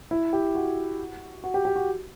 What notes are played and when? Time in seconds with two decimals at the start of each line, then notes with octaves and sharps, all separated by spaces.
0.11 E4
0.33 G4
0.55 F#4
1.44 F#4
1.54 G4
1.65 G4
1.76 F#4